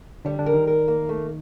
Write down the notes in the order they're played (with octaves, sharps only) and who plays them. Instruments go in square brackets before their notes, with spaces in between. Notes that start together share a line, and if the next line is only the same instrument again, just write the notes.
[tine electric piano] D3 D4 [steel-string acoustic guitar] G3
[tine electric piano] D3 D4
[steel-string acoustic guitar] A#4
[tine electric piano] D#3 D#4
[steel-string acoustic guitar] A#4
A#3
A3